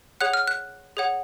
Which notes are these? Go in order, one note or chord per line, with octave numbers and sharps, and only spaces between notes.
G#4 C#5 F#5 F#6
F6
F#6
G#4 C#5 F#5